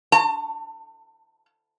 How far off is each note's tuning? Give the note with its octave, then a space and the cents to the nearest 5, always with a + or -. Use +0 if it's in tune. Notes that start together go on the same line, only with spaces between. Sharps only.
A5 +30